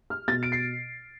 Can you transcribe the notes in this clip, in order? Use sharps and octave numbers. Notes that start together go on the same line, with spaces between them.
F6
B2 A6
D7
C7